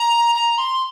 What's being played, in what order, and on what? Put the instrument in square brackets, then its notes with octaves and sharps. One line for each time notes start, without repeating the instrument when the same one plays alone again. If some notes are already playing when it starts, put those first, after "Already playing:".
Already playing: [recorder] A#5
A#5
C6